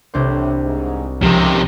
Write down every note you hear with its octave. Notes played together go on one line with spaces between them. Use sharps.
C2 A2 D4 C5
G#2
C#2 C3 D#3 F3 G#3 C#4 G4 F5